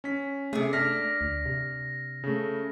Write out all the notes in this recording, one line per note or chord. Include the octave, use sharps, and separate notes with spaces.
C#4 B6
C3 A3 G#4
D4 F6 A#6 B6
D2
C3
C#3 A3